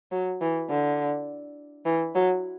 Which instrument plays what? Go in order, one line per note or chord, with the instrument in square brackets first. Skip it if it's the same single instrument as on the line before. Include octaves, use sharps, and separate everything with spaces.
[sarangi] F#3
E3
D3
E3
F#3